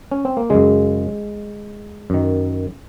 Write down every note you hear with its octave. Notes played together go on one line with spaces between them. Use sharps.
C#4
C4
A#3
F#2 C#3 G#3
F#2 D#3